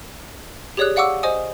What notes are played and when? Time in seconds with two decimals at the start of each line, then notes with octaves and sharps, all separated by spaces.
0.77 G4 G#4 C#5 D5 D#6 F#6
0.96 D5 F5 F#5 C#6 D6 E6
1.23 C5 D#5 G#5 D#6